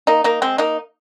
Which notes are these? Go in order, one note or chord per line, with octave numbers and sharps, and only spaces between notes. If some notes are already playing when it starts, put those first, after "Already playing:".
A#3 D#4
A#3 D#4
G#3 C4
A#3 D#4